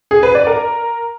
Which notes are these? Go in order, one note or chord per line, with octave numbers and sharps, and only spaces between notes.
G#4
B4
D5
A#4